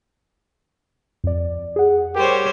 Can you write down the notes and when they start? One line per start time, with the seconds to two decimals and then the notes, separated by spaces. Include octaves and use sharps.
1.24 F2 D5
1.76 G#4 F#5
2.16 G3 G4 A#4 C5 C#5